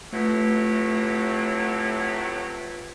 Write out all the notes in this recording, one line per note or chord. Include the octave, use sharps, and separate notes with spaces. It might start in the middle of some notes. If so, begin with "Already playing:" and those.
A2 C3 F#3 A3 F4 B4 E5